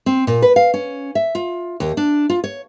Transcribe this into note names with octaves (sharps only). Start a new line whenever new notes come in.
C4
A#2
B4
F5
C#4
E5
F4
D#2
D4
F4
C#5